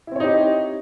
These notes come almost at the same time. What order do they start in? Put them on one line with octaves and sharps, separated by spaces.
E4 C4 C#5 D#4 G4